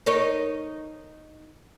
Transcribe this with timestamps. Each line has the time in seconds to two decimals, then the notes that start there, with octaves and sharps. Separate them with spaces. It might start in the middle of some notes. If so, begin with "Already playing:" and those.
0.06 D#4 A#4 C#5